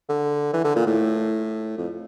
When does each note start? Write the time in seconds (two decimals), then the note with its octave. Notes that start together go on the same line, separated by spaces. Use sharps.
0.09 D3
0.53 E3
0.65 D3
0.76 A#2
0.86 A2
1.78 F2